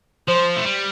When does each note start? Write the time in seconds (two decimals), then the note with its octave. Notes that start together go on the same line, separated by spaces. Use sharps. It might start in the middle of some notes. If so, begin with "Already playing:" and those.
0.28 F3 C5
0.56 A3
0.66 G3